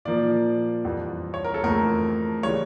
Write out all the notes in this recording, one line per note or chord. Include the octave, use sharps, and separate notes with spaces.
A#2 F3 A#3 D5
F2 E3 G3
C#5
A#4
A4
F2 C#3 E3 A3 A#4
C#3 E3 G3 C#5